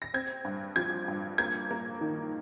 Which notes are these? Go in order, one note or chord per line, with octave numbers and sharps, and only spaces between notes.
A#6
C4 G#6
G2
F3 G#6
G2
A#3 G#6
A#3
D#3